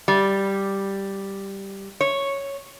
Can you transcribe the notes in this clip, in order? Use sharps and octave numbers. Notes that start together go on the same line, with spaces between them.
G3
C#5